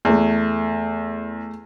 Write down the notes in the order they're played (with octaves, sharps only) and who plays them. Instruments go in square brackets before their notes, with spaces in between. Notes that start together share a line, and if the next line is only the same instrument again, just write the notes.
[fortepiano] E2 [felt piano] A3 G#4